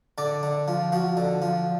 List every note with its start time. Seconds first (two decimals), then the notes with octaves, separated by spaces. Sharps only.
0.18 D3 D5
0.43 D3
0.68 F3
0.92 F3 F#4
1.17 D3
1.42 F3